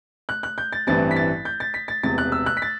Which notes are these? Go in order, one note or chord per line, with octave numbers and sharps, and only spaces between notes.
F#6
F#6
G6
A6
A1 G2 E3 G3 C4 A6
B6
A6
G6
A6
B6
A6
E1 E2 C3 A6
F#6
E6
F#6
B6
A6